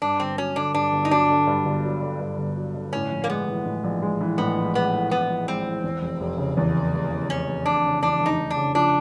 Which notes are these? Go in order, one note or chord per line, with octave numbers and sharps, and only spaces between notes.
G2 D4
G1 C4
F#3 C#4
D3 D4
G2 D4
G1
D#4
F#3 D4
D3
G2
G1
F#3
D3
G2
G1
F#3
D3
A2 C#4
A#1
A#3
G#3 B3
E3
A2
A#1
G#3
E3
A2 B3
A#1
G#3 B3
E3
A2 B3
A#1
G#3 C4
E3
E2
F1
F1
C#3
E2
F1
F1
C#3
E2 C#4
F1
F1 D4
C#3
E2 D4
F1
D#4
F1
D4
C#3
F3 D4